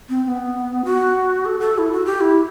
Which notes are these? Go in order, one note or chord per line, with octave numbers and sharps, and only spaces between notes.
C4
C4
B3
F#4
A4
A4
E4
F#4
G4
E4